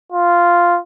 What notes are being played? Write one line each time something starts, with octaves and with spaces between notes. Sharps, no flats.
F4